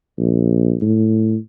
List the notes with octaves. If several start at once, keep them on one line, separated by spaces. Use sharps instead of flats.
A#1
A2